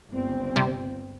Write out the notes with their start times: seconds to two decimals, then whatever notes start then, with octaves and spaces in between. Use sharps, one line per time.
0.12 G1 C#2 C4
0.56 C3 G3